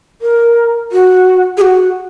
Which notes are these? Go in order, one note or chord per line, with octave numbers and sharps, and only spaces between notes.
A#4
F#4
G#4
F#4